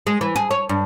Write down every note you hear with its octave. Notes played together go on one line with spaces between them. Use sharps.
G#3
E3
G#4
C#5
G2